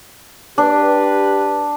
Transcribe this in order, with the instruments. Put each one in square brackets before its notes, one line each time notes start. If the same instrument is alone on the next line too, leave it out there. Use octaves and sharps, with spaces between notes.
[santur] D4 [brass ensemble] G4 B4